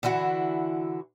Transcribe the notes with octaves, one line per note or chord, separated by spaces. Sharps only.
D3 E3 E4 F#4